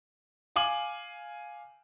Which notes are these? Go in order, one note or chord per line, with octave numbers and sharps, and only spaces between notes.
F5 G#5 D6 F#7